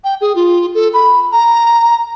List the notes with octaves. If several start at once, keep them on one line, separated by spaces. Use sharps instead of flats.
G5
G#4
F4
A4
B5
A#5